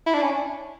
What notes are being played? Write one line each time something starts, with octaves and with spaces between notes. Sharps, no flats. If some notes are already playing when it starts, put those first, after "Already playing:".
E4
D4
C#4